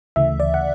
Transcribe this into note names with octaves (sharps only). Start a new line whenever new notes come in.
D2 C#3 E3 A3 E5
D5
F#5